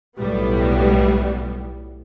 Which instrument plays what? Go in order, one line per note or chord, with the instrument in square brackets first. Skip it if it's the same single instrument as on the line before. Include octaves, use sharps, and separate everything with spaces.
[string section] B1 A2 G3 B3